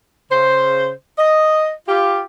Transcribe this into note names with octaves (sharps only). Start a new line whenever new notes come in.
C#3 C5
D#5
F4 G4